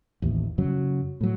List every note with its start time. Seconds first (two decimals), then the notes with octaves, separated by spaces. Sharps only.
0.22 A1 D#2
0.58 F#2 C#3 F#3
1.21 A2 F#3